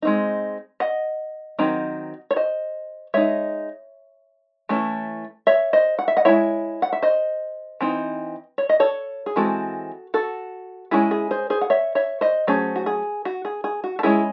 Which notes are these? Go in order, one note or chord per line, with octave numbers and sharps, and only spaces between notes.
G#3 C4 D#4
D#5 F#5
D#3 F#3 C4 D#4
C#5
C5 D#5
G#3 D#4 C#5 E5
E3 A3 C#4 E4
C#5 E5
C5 D#5
F#5
E5
D#5 F#5
G#3 C4 E4 C#5 E5
F#5
E5
C5 D#5
E3 C4 D#4
C#5
D#5
A4 C#5
G#4
E3 G#3 C4 F#4 A4
F#4 A4
G#3 C#4 E4 G#4
G#4
G#4 C5
G#4 C5
F#5
C#5 E5
C#5 E5
C5 D#5
F#3 A3 C#4 G#4 C5
F#4
G#4
F#4
G#4
G#4
F#4
A4
G#3 C#4 E4 G#4